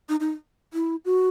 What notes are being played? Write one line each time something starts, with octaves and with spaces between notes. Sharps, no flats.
D#4
D#4
E4
F#4